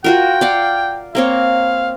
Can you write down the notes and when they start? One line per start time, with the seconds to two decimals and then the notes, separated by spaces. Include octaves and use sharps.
0.04 F4 F#4 A#4 G5
0.41 D5 F5 F#5
1.15 A#3 C4 C#5 F5